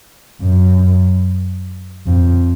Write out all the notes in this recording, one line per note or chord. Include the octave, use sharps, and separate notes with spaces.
F#2
F2